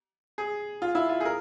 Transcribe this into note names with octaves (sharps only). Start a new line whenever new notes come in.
G#4
F4
E4
F4
G#4
A#4